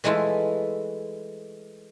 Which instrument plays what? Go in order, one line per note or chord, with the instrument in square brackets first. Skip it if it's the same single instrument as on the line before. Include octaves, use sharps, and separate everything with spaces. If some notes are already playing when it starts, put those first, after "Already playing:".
[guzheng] E3 G#3 A3 E4 F4